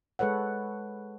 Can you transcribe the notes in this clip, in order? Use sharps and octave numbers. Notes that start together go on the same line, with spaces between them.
G#3 A4 B4 C#5 F#5